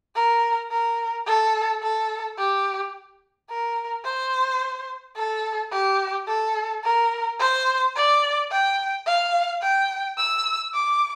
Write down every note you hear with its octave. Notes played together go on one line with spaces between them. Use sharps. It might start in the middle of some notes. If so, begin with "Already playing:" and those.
A#4
A#4
A4
A4
G4
A#4
C5
A4
G4
A4
A#4
C5
D5
G5
F5
G5
E6
D6